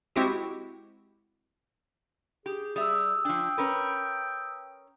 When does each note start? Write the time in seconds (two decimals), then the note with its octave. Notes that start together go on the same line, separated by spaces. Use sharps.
0.16 G#3 C4 E4 F#4 G4
2.46 G4 G#4
2.76 G3 E5 D#6 E6
3.25 F3 D4 G5
3.58 C#4 A#4 B4